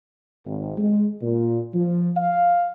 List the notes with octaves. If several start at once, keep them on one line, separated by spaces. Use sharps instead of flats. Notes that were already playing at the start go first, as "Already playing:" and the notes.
G#1
G#3
A#2
F3
F5